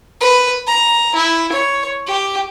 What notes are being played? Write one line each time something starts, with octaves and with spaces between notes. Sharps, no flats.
B4
A#5
E4
C#5
G4